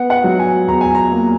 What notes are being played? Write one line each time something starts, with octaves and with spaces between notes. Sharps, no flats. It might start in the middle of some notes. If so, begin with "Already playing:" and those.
Already playing: B3 F#5
F#5
F#3
G#5
E2 A#5
G#5
A#5
A#3